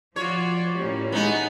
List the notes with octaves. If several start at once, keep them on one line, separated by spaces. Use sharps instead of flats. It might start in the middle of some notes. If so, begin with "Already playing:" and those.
F3 F4 F#4 C#5 D5
A2 A#3 C#4 G4
G#3 B3 D#4